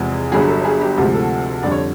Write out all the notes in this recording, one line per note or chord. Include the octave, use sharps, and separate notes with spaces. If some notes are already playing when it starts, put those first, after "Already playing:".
Already playing: E2 C3 F3 G#3
G1 G2 D3 F#3 G#4
A4
G#4
G4
D2 C3 F3 G#3 G4
A4
F2 D3 G3 D5
C#5